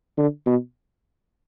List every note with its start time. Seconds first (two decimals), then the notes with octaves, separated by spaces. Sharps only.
0.17 D3
0.46 B2